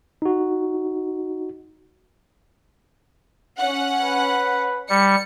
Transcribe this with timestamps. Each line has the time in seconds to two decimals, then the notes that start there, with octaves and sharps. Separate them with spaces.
0.22 D#4 F#4
3.58 C#4 F#5
4.01 B4
4.90 G3 C#7